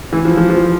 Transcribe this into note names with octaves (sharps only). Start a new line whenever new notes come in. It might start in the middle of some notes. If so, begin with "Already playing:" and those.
E3
F3
F3
F3